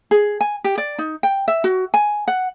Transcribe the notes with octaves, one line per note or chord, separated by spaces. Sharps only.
G#4
G#5
G4
D5
D#4
G5
E5
F#4
G#5
F#5